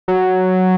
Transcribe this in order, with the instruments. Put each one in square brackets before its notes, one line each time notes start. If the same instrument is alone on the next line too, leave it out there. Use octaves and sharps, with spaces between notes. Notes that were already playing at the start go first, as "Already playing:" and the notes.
[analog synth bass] F#3